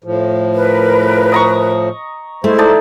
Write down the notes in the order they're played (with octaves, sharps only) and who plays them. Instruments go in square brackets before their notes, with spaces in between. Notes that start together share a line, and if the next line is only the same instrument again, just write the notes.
[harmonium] A2 F3
[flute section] A#4 B4
[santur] D#5 A#5 C#6
[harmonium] G#3 C5 [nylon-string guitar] A3 [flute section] E4
[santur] D#4 D5 A5